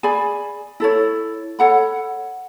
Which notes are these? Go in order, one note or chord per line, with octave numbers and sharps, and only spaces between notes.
G#4 D5 G#5 B5
E4 A4 C#5
A4 C#5 F#5 B5